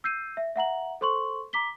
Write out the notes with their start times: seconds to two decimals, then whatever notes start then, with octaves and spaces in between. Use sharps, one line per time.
0.04 E6 G6 C7 D#7
0.37 E5
0.56 E5 F#5 A#5 F#7
1.01 A4 C5 C6 C#6 F#7
1.53 A#5 D6 B6 G7